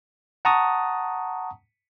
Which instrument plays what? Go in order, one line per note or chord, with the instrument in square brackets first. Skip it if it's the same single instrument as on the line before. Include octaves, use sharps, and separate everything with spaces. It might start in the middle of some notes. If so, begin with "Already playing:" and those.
[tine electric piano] F#5 A5 A#5 C#6 D#6